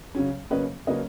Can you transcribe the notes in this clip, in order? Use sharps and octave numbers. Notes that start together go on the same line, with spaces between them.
C#3 F#3 C#4
C#3 F#3 A#3 C#4 B4 D#5
C#3 F#3 A#3 C#4 B4 D#5